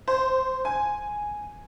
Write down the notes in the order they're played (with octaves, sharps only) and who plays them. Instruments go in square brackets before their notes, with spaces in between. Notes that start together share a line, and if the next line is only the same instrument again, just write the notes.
[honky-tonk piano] C5
G#5